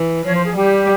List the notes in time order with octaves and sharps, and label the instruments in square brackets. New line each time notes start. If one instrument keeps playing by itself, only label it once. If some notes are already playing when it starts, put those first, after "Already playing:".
Already playing: [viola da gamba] E3
[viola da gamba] F3 [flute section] C#5
[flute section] C5
G#4
[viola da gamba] G3 [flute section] G4